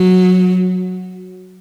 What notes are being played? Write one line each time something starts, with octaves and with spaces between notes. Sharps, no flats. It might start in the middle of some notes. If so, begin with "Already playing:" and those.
Already playing: F#3